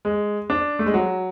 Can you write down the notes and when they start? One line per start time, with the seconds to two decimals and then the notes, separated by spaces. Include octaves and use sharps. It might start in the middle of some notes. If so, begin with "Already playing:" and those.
0.05 G#3
0.50 D4
0.79 A3
0.86 G#3
0.94 F#3